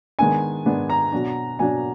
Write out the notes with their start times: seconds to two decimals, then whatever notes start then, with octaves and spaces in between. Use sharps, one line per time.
0.19 D#3 G#3 B3 D4 G#5
0.66 D#3 G#3 B3 D4
0.90 A#5
1.12 B2 F#3 D4
1.59 B2 F#3 D4 G#5